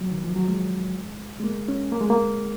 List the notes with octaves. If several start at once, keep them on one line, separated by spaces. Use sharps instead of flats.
F#3
D#3
F3
F#3
G#3
G#3
A#3
C#4
A#3
G#3
A#3